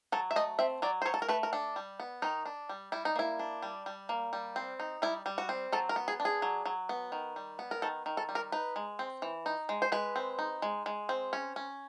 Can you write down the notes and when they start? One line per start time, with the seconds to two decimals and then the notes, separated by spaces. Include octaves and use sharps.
0.12 F#3 A4
0.31 E5
0.36 A3 D#5
0.59 C4 E5
0.82 F#3 D5
1.02 C5
1.05 F#3 C#5
1.14 A4
1.22 A#4
1.29 A3 B4
1.43 A#4
1.53 D4 A4
1.76 G3
2.00 B3
2.22 D#3 D#4
2.46 D4
2.69 G3
2.92 G3 E4
3.05 D#4
3.16 A#3 E4
3.39 D4
3.62 G3
3.86 G3
4.09 A#3
4.33 G3
4.56 C4
4.80 D#4
5.02 G3 E4
5.26 G3
5.38 F#4
5.49 C4
5.72 F#3 A4
5.89 A#4
5.96 B3
6.08 G#4
6.20 D4
6.25 G#4
6.42 F#3
6.66 F#3
6.89 B3
7.12 D#3
7.36 G3
7.59 B3
7.71 A#4
7.82 D#3 A4
8.06 D#3
8.17 A4
8.29 G3
8.35 A#4
8.52 D#4 B4
8.76 G#3
8.99 C4
9.22 E3
9.46 D#4
9.69 G#3
9.82 C5
9.92 G#3 B4
10.16 C4
10.39 D#4
10.62 G#3
10.86 G#3
11.09 C4
11.33 C#4
11.56 C#4